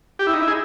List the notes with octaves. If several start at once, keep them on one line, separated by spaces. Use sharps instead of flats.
G4
E4
D#4
E4
G#4